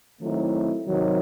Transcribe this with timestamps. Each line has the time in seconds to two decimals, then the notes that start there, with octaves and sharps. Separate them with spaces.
0.21 D#3 F#3 A3 C4 E4
0.87 C3 D#3 F#3